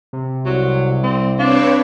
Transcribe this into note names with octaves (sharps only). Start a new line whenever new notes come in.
C3
C2 F#3
G3 C4
C4 D4 B4 C#5 F5